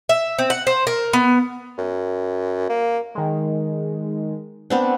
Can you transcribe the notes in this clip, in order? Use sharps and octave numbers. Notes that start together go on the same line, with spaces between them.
E5
C4
F#5
C5
A#4
B3
F#2
A#3
D#3 G#3
B3 C4 D4